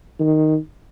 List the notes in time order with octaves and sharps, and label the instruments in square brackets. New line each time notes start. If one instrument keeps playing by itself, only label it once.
[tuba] D#3